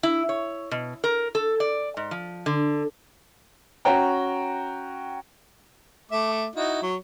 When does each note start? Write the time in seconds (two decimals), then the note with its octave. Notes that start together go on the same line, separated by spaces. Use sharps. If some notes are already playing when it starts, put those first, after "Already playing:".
0.03 E4
0.29 C#5
0.71 B2
1.04 A#4
1.35 A4
1.60 D5
1.97 G#2
2.11 F3
2.46 D3
3.85 C#4 F#4 G5 A#5
6.12 A3 E5 D6
6.56 D#4 E4 F#4
6.83 F#3 C#5